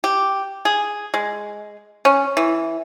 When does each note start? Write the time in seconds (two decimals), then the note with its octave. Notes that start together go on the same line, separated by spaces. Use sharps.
0.04 G4
0.65 G#4
1.14 G#3
2.05 C#4
2.37 E3